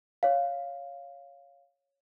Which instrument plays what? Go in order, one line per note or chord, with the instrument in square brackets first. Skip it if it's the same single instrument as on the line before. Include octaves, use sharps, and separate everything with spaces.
[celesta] C#5 F5